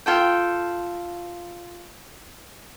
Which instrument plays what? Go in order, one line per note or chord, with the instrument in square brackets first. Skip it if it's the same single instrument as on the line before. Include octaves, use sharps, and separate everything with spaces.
[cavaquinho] F4 A4 G5